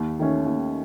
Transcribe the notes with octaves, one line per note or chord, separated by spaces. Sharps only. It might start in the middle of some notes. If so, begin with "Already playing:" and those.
Already playing: D#2
D#3 A3 C#4
D#2